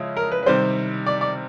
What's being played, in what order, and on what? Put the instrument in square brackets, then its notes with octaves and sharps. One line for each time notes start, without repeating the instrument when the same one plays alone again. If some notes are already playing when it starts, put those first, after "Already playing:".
Already playing: [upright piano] C#3 F3 G#3 E4
[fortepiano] A#4
B4
B4
[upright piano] C3 D#3 G3 C4 [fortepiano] C5
[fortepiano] D5
D5